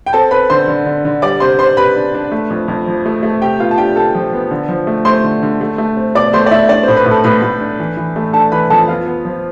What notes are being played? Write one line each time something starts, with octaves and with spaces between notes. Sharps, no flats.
G5
C4 A4 A5
C4 B4 B5
D3 C5 C6
D3
D3
D3
G3 D5 D6
C3 C5 C6
C3 C5 C6
C3 B4 B5
D4
D4
A3
F2
F2
F3
A3
A3
C3 G4 G5
B3 F4 F5
A5
D4 G4 G5
C3 A4 A5
F3
B3
D3
F3
A3
A3 C5 C6
D3
D3
A3
A3
C4
B2 D5 D6
A3 C5 C6
D5
A3 E4 E5
D4 D5
A2 C4 C5
B4
A2
A4
A2 B4
A2
D4
E3
E3
A3
D4 A4 A5
E3 B4 B5
F2 A4 A5
B3 F4 F5
B3
F3